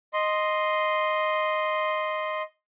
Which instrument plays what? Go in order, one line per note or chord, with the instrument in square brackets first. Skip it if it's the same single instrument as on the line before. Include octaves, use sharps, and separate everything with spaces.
[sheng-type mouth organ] D#5 C6